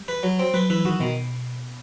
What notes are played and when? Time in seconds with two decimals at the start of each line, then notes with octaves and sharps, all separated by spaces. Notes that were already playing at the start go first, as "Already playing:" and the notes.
Already playing: G3
0.08 B4
0.23 F#3
0.39 C4
0.54 F#3 B4
0.70 E3 B4
0.85 D#3 F#4
1.00 B2 D#3